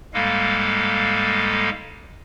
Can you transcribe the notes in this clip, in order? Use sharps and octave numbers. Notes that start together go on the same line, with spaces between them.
G#2 G3 G#3 A#3 A4 F5